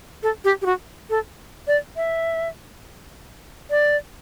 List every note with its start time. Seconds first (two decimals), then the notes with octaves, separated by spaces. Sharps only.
0.23 A4
0.44 G4
0.62 G4
0.66 F#4
1.10 A4
1.67 D5
1.96 E5
3.70 D5